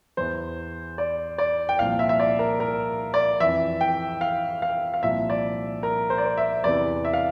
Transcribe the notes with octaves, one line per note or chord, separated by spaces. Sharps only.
E2 E3 C5
D5
D5
G5
C2 A#2 F3 F5
E5
E5
D5
A#4
A#4
D5
F2 E3 E5
G5
F5
F5
F5
C2 A#2 F3 E5
D5
A#4
C5
D5
C5
E5
E2 C3 E3 D5
E5
F5